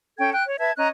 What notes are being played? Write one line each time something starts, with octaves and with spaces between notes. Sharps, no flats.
C#4 A4 G5 G#6
G5 F#6
C#5
B4 E5 A5 G#6
C#4 D#5 A#5 F#6